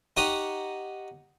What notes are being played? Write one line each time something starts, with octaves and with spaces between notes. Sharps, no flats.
D#4 G4 C#5 F#5 A#5 D#6